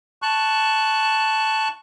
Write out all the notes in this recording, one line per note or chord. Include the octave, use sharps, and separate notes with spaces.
A5 C#6 F#6